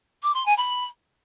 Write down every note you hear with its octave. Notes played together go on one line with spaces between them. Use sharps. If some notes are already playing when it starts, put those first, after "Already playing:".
D6
C6
G#5
B5